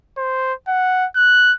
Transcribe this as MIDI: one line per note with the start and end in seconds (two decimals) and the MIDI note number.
0.17 0.54 72
0.68 1.06 78
1.16 1.53 90